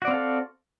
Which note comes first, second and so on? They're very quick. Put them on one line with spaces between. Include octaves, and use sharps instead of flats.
F#4 D5 C4 F5 A4